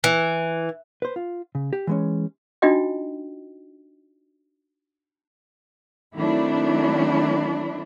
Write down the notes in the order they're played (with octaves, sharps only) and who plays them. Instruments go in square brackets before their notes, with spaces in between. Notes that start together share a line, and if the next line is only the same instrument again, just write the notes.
[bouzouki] E3
[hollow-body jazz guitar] B4 C5
F4
C#3
G4
E3 G#3 C#4
[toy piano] D4 D#4 F4 F#4 D#5 G5
[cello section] D#3 F#3 A3 C4 D4 E4